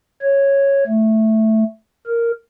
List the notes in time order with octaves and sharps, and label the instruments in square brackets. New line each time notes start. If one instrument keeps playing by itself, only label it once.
[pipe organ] C#5
A3
A#4